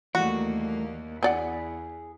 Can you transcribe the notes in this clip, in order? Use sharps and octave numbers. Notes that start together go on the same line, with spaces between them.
D#2 E3 G3 A3 A#3 F#4
E2 C4 G#4 D5 F#5